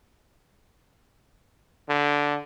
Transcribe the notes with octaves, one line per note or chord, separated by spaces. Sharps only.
D3